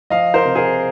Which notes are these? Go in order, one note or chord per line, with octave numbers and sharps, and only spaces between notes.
F3 D#5 F5
A#4 C5
C3
G#4 A#4